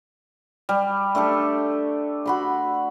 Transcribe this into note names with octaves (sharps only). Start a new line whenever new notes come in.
G3
A3 D4 G4 A4
F#4 B5 C6